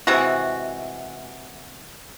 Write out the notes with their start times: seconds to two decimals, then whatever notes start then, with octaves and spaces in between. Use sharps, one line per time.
0.07 C3 E3 G#3 F#4